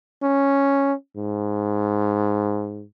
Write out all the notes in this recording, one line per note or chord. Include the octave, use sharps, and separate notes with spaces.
C#4
G#2